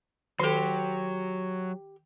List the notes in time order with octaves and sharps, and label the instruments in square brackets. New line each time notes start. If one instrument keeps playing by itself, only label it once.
[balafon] D#3 A4 [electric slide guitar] F#3 [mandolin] G4 C6